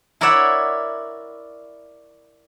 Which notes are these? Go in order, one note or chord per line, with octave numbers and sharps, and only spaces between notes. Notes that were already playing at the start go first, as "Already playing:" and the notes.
E4 A#4 C#5 D5 E5 F#5